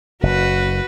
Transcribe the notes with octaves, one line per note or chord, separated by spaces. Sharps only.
F#1 F#4 B4